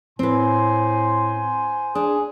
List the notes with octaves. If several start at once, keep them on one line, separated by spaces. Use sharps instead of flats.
A2 C4 B4 C5 G#5 C6
D4 G#4